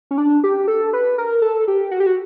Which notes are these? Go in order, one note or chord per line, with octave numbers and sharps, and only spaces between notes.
C#4
D4
G4
A4
B4
A#4
A4
G4
F#4
G4
F#4